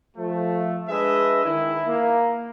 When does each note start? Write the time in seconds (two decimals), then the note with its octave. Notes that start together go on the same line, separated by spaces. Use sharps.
0.17 F3 A3
0.89 G#3 D4 B4 D#5 E5
1.45 D#3 E4
1.87 A#3